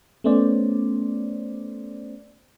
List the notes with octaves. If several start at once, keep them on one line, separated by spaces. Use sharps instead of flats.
A3 B3 C#4 C5 D5